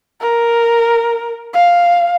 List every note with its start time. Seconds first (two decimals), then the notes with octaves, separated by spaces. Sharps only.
0.21 A#4
1.54 F5